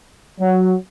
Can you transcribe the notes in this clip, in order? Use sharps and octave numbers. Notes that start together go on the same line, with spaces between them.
F#3